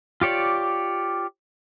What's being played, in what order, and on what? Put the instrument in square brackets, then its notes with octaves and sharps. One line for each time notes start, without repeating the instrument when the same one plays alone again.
[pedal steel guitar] F4 G4 C#5 D5